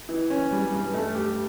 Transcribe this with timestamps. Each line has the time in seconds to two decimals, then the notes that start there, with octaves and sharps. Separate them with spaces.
0.09 E3
0.30 C#4
0.52 G3
0.72 G2
0.94 A3
1.15 G4